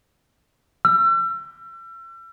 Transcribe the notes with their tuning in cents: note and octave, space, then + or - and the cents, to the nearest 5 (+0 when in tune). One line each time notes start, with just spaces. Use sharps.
E6 +40